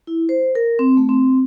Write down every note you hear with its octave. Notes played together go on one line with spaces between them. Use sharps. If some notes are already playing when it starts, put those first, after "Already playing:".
E4
C5
A#4
C4
A3
C4